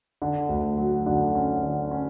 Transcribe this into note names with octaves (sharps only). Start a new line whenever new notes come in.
D3
D2
F#3
D3
C#4
D3
C#4